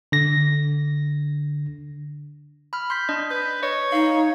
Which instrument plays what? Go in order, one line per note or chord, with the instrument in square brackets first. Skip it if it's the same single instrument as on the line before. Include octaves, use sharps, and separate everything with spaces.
[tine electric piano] D3 A#6
[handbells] B5 F6
C6 G6 B6
D4 D#5
[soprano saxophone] B4 [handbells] G6
[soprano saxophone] C#5 [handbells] D#5
[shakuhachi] D#4 [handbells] F5